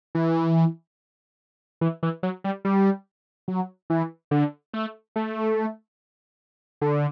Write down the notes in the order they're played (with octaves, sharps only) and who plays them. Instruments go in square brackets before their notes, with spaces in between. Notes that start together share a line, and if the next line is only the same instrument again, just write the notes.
[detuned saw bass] E3
E3
E3
F#3
G3
G3
F#3
E3
D3
A3
A3
D3